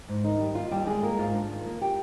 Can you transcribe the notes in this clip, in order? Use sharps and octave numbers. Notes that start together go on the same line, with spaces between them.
G#2
D#3 D#4
G3
D#2 F4
D#2 G3 G4
D3 G#3 G#4
G#3 A#3 A#4
G#2 F4 F5
D4
D#3
A#3
G4 G5